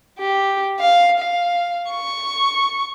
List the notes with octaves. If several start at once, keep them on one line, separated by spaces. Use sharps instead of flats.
G4
F5
F5
C#6